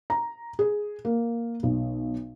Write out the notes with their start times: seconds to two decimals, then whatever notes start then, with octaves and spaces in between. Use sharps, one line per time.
0.10 A#5
0.59 G#4
1.05 A#3
1.63 B1